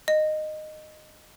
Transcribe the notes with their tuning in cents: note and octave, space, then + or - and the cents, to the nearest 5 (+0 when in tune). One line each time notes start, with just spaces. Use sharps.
D#5 -15